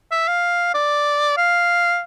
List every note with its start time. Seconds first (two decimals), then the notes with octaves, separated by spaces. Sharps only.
0.12 E5
0.28 F5
0.74 D5
1.37 F5